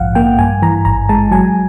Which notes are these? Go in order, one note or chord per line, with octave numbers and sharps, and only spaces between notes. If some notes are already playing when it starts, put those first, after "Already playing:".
Already playing: A#1 G#2 F3 F5 F#5
A#3 G5
G2 G#5
E3 A#5
G#1 A#5
G#3 A5
F#3 G#5